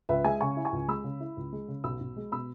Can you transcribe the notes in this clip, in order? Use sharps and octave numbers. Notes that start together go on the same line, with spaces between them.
C#2 B4 E5
G#3 E5 G#5
C#3 G#5 C#6
E4
G#5 C#6
C#2
G#3 B5 E6
C#3
E4
C#2
G#3
C#3
B1 B5 E6
B1
G#3
B2 B5 E6